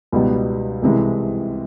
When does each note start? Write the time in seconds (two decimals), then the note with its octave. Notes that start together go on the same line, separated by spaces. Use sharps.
0.12 C#2 B2 G3 B3 D#4
0.82 C2 C3 E3 G#3